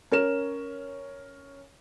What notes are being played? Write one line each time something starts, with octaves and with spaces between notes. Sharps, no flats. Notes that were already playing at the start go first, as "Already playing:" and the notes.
C#4 A#4 E7